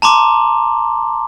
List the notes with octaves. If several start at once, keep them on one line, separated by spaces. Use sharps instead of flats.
A5 A#5 C6 D6